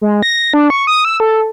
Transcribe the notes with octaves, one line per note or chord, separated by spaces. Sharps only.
G#3
A#6
D4
C#6
D#6
E6
A4